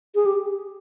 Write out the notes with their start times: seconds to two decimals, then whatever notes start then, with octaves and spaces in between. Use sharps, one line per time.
0.15 G#4
0.26 G4